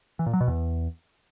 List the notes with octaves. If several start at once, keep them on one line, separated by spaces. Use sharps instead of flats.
E3
A#2
F#3
B2
E2